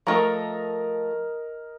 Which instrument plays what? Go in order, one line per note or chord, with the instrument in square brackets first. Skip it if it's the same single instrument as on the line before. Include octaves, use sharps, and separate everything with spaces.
[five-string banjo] F3 A3 [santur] A#4 D#5 A#5